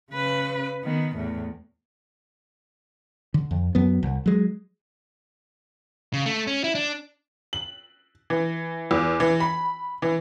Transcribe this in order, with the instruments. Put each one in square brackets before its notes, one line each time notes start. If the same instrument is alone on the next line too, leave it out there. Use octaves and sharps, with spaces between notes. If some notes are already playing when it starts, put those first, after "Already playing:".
[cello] C#3 B4
D#3 B3
E2 A2
[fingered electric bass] D3
F2
F#2 F#3 B3
C2
F#3 G#3
[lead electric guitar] C#3
A3
C#4
E4
D4
[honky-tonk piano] F#7
E3
E2
E3
B5
E3